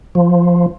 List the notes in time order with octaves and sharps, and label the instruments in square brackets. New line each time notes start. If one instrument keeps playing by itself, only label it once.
[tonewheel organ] F3